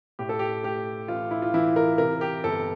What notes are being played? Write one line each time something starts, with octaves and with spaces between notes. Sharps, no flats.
A2 G4
A4
G4
A3 G4
A1 F4
E4
F4
E3 E4
A#4
C3 A#4
G4
G1 A4